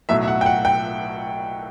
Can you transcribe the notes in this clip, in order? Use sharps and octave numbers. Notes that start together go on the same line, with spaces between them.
B1 A2 F#3 E5
E5
F#5
G5
F#5
G5